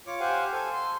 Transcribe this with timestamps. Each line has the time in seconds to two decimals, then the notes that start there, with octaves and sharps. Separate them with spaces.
0.07 F4 C#5 D6
0.20 G4 C5 F5 F#5 G#5
0.52 A4 C5 G#5
0.73 C6